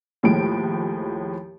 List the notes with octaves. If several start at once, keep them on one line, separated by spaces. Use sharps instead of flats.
D#2 A2 F3 G#3 D7